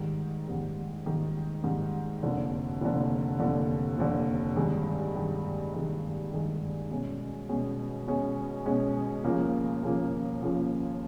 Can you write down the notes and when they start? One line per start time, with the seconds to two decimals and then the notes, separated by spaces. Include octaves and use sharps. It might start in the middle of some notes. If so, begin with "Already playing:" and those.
Already playing: G#2 D#3 G3
0.48 G#2 D#3 G3
1.05 G#2 D#3 G3
1.63 G#2 D#3 G3
2.23 F1 D#2 D3
2.81 F1 D#2 D3
3.40 F1 D#2 D3
3.98 F1 D#2 D3
4.56 G2 D#3 G#3
5.15 G2 D#3 G#3
5.74 G2 D#3 G#3
6.32 G2 D#3 G#3
6.90 B2 G#3 C#4
7.49 B2 G#3 C#4
8.07 B2 G#3 C#4
8.66 B2 G#3 C#4
9.24 D#2 C#3 F3 A#3
9.83 D#2 C#3 F3 A#3
10.42 D#2 C#3 F3 A#3